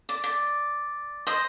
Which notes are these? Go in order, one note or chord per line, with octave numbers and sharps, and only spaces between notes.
D5
D5
C5 D#5